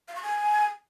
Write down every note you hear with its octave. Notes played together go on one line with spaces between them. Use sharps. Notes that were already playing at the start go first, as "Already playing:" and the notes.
F5
C#6
G#5